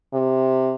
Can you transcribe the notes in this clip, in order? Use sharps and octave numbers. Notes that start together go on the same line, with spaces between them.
C3